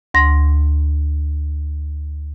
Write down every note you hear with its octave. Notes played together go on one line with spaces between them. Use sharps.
D2 C6 A#6